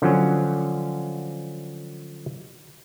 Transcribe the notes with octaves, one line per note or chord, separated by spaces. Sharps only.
D3 F3 F#3 C#4